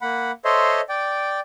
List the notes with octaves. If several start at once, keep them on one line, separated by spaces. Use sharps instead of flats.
A#3 F#5 B5
A4 C5 C#5 D#5 E5 C6
D5 G5